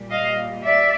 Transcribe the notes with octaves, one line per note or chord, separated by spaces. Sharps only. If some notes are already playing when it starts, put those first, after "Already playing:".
Already playing: A#2 G3
D#5 F5
D5 E5